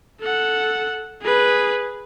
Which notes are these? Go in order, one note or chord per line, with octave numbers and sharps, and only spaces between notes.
A4 F#5
G#4 B4